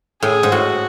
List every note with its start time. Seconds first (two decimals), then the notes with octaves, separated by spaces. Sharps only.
0.22 A2 G#4
0.43 G#2
0.51 A2 F#4